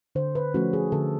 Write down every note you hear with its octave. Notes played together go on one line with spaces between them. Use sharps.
D3 C5
B4
F3 A3 C#4 F#4
G#4
D3 A4